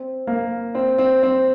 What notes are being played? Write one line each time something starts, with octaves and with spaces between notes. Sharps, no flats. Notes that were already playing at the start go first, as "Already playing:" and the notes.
Already playing: C4
A#3
C4
C4
C4